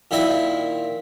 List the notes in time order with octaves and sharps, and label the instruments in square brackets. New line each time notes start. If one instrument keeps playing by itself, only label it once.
[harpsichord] A#2 D#3 C4 E4 A#4 B5